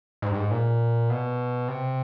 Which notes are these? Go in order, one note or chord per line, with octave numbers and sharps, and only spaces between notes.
G#2
G2
G#2
A#2
B2
C3